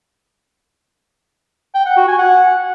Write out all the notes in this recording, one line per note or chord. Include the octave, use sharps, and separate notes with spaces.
G5
F#5
F#4
G#5
F#5